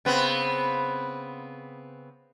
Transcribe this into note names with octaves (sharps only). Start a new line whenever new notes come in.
C#3 B3 C4